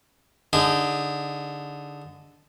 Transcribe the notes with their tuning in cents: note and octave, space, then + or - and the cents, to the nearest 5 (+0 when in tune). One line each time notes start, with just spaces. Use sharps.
D3 -10 D#4 +0 G#4 -25